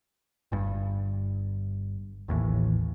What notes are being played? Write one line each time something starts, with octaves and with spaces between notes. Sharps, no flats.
G1 G2
A1 D#2 A2 E3